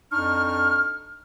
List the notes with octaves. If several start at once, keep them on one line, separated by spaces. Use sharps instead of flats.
F2 D4 D#4 C#6 F6